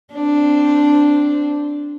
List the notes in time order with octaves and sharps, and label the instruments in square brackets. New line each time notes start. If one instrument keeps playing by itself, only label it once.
[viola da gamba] C4 D4